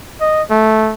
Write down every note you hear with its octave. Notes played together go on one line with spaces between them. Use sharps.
D#5
A3